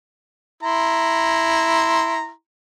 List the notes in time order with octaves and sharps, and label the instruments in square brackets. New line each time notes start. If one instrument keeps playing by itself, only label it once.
[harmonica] E4 A#5 C6